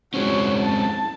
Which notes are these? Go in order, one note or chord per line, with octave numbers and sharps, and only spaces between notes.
G#3 C4 C#4 F#4 C#5
A5